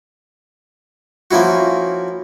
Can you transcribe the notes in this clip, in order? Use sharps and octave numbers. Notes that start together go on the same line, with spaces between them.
F3 A#3 C#4 E4 F#4